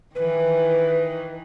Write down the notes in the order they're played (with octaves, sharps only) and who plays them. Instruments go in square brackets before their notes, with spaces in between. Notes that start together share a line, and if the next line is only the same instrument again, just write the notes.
[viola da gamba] D#3 E3 [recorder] B4